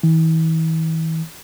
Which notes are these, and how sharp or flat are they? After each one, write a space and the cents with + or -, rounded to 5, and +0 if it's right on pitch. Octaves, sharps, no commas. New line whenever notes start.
E3 -35